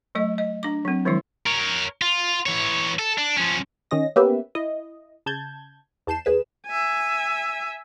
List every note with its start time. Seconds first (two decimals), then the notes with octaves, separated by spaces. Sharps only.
0.15 F#3 A3 D#5
0.38 D#5
0.63 D4 D6
0.85 F#3 C4
1.05 D#3 F3 F#3 G#3 E4
1.47 A#4 C#5
2.02 F4
2.46 E3 C#5
2.99 A4
3.18 D4
3.37 F3 C#4
3.91 D#3 C#4 D#5 A#6
4.16 A#3 B3 C#4 G4 B4 E5
4.55 E4 D#5
5.26 C#3 A5 G6 G#6
6.07 E2 A5 G6 C7 E7
6.25 D#2 G#4 B4 E7
6.67 E5 G#5